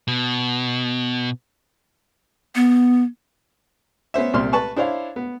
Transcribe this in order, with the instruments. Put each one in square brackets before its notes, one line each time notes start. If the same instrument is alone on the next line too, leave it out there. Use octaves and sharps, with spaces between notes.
[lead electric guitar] B2
[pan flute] B3
[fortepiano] B3 C#4 C5 E5
C2 A#2 C4 C6 F6
B4 A5 C#6
D4 E4 C5 C#5 F5
B3